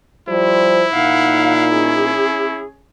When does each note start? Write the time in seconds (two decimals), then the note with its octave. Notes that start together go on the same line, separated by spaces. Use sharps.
0.28 F3 G3 E4 C5
0.93 A#2 D#4 F5 F#5
1.70 C#4 G#4